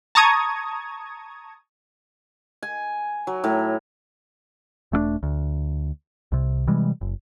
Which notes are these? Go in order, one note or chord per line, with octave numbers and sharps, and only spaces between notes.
A5 A#5 C#6 D#6 G#6
G#5
F#3
A2
E1 A3 A#3 D4
D2
C2 C3
C3 E3 G3 G#3
F#1